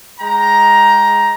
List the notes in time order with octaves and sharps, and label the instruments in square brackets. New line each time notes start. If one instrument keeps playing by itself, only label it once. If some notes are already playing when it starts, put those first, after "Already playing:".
[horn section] G#3 G5 A#5